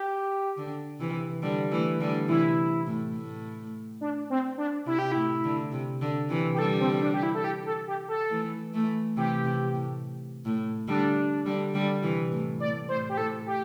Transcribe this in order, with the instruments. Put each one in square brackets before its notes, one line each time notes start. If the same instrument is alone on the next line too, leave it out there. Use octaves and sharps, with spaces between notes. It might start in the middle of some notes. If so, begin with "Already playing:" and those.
Already playing: [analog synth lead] G4
[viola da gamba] D3
C3 E3
D3 G3
E3 A3
D3 G3
[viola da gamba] C3 E3 [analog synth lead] E4
[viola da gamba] A2
A2
[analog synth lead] D4
C4
D4
[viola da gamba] C3 [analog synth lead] E4
[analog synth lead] G4
[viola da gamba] A2 [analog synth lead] E4
[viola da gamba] D3
C3
D3
C3 E3
[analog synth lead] G4
[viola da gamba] D3 G3 [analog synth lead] A4
[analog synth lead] C4
D4
G4
E4
A4
G4
A4
G4
A4
[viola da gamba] E3 A3
E3 A3
[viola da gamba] C3 E3 [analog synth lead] G4
[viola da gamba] C3
A2
A2
[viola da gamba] D3 G3 [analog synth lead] D4
[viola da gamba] D3 G3
D3 G3
C3 E3
A2
[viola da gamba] A2 [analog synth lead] D5
[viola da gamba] A2 [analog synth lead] C5
[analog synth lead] G4
[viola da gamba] A2 [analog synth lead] A4
[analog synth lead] G4